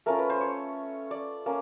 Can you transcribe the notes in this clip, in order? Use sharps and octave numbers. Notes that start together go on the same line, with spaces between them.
A3 C#4 F4 A#4
B4
C5
C#5
D5
A#3 C#4